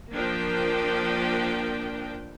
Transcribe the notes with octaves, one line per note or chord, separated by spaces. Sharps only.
F3 A#3 D4 A#4 G5